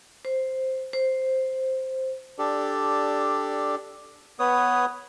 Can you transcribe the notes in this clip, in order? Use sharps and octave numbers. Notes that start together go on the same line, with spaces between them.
C5
C5
D4 G4 A4 D5
B3 B4 C#5 D#6